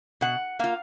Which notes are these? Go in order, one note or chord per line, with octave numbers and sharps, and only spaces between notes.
B2 F#5
A#3 F4 F5